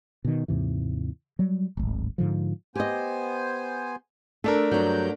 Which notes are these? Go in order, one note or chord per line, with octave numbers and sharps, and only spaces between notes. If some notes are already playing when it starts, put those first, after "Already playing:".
B2 D#3
D#2 G#2 C3 E3
F#3 G3
D1 G#1
G#2 D3 F3
B3 G4 C5 D#5 G#5
A3 D4 A4 A#4
G2 F#3 A#5 G6